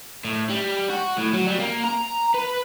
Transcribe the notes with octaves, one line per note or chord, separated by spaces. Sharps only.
A2
G3
F#4
A2
F#3
G3
A#3
A#5
B4